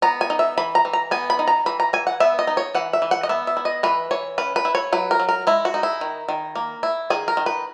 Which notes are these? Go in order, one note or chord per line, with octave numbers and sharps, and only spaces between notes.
B3 A#5
G#5
D#4
E5
E3 B5
A#5
E3
A#5
B3 G#5
B5
D#4
A#5
E3 B5
A#5
E3 G#5
F#5
B3 E5
D#5
D#4
C#5
E3 F#5
E5
E3
F#5
D#5
B3 E5
E5
E4
D#5
E3 B4
E3 C#5
C#4 B4
B4
E4
C#5
F#3 B4
A#4
F#3
A#4
G#3 E4
F#4
D#4
E4
D#3
D#3
A#3
E4
D#3 G#4
A#4
D#3
B4